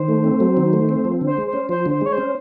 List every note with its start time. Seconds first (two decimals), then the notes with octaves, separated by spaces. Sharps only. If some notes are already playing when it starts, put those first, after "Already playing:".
Already playing: D#3 C5
0.08 A3
0.24 C4
0.40 F#3
0.57 D#3
0.73 A3
0.89 C4
1.05 F3
1.21 D3
1.27 C5
1.37 G#3
1.47 C5
1.53 C#4
1.69 F3 C5
1.86 D3 C5
2.01 G#3 C#5
2.13 C#4 C5